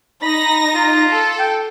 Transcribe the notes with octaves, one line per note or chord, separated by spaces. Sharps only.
D#4 B5 A#6
F4
A4
G5